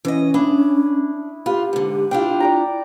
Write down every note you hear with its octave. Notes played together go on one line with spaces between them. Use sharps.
E3 C#4 D#5
D4 E4 D#6
F4 G4 B4
G#2 D3
D4 E4 F4 G5
D5 G5 A#5